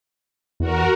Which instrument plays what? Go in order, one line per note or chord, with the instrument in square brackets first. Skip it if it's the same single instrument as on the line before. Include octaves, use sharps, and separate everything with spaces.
[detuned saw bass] E2 [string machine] F#4 A#4